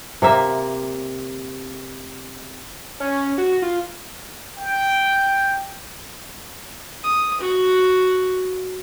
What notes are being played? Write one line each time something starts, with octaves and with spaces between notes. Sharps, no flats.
C3 A#3 E5
C#4
F#4
F4
G5
D#6
F#4